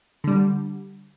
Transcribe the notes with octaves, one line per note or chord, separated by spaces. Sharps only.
D3 G3